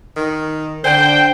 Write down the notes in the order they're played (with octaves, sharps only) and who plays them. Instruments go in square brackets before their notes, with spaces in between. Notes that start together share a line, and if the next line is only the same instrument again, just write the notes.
[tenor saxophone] D#3
[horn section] D3 G5 [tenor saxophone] C5